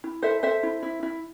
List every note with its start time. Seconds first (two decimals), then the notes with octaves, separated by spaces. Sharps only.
0.04 E4
0.23 A4 C5 E5
0.43 A4 C5 E5
0.63 E4
0.83 E4
1.03 E4